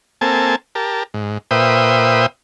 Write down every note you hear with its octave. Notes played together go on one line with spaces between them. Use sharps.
A#3 C4 A4 G#5 A5
G4 A#4 A5
G#2
A#2 B4 C5 E5 G5 D#6